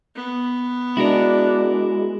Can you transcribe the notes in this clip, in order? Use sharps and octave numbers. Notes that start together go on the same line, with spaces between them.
B3
G#3 D4 E4 F#4 A#4